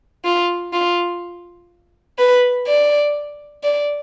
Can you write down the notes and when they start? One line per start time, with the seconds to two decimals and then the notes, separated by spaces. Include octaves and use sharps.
0.25 F4
0.73 F4
2.18 B4
2.67 D5
3.64 D5